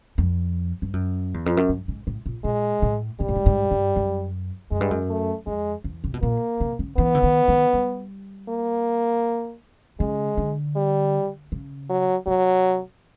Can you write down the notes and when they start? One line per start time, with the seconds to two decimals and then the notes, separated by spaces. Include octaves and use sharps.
0.18 F2
0.82 G2
0.93 F#2
1.34 E2
1.46 F2
1.57 F#2
1.69 G2
1.88 G#2
2.07 A2
2.26 A#2
2.44 A#2 G#3
2.82 A2
3.20 G#2 G3
3.28 A2
3.36 G#2
3.46 G#2
3.71 G2
3.96 F#2
4.71 F#2 G#3
4.81 G2
4.91 F#2
5.10 A3
5.47 F2 G#3
5.84 E2
6.04 C3
6.14 B2
6.22 A#2 A#3
6.61 C3
6.79 C#3
6.97 E3 B3
7.15 D3
7.23 D#3
7.48 D#3
7.73 G3
8.49 A#3
10.00 C#3 G#3
10.37 D3
10.76 G3
11.52 C#3
11.90 F#3
12.27 C3 F#3